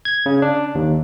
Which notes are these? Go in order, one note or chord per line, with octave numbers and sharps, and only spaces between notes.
G#6
C#3
D4
D#2